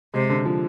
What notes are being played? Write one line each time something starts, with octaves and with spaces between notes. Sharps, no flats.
C3 G#3
D3
F3